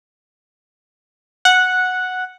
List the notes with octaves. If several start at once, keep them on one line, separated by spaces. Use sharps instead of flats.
F#5